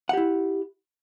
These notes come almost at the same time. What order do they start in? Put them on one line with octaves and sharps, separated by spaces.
F#5 G4 E4